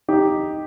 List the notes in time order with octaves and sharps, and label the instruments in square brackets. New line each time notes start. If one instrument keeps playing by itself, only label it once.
[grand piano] D#4 G4